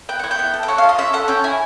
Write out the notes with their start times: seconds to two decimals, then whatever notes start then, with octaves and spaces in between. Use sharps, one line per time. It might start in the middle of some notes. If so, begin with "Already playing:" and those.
0.09 B3 G5
0.19 E4 F#5
0.31 G5
0.39 B3
0.54 A4
0.63 G5
0.68 C#4 F#5
0.78 F5
0.83 F4
0.89 D#5
0.98 C#4 E5
1.13 A4 F#5
1.28 C#4 G5
1.44 E4 G#5